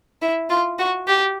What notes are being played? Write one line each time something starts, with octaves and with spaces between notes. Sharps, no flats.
E4
F4
F#4
G4